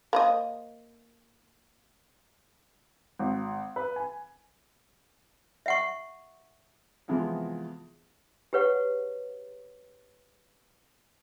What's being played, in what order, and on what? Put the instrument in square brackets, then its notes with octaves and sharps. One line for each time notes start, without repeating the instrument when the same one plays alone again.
[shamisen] A#3 C5 D#5
[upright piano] G#1
B4
G#5
[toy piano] E5 F#5 C#6
[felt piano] F2 C3 E3 F3 G#3 B3
[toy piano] G4 G#4 B4 C#5 F#5